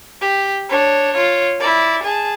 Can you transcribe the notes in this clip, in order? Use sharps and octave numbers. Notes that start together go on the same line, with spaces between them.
G4
D4 C#5
F4 C#5
E4 D5
G#4 A5